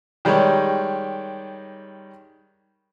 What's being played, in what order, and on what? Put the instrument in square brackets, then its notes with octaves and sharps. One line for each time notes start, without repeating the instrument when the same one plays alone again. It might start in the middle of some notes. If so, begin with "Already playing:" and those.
[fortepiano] D#3 G3 G#3 C#5